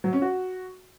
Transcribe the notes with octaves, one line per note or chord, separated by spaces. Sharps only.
F#3
C#4
F#4